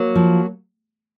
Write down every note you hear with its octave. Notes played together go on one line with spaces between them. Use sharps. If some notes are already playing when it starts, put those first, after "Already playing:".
Already playing: F#3 A#3
F3